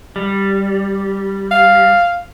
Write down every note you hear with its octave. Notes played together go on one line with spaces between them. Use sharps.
G3
F5